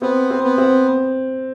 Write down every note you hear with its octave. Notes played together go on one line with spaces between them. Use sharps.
B3 C4
C4
B3
C4